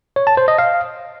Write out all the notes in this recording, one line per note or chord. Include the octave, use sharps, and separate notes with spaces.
C#5
A5
C5
D#5
F5